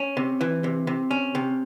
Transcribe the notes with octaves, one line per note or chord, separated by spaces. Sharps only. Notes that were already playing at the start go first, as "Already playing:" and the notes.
Already playing: C#4
C3
E3
C3
C3
C#4
C3